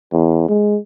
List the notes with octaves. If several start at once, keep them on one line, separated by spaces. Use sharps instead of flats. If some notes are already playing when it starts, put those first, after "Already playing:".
E2
G#3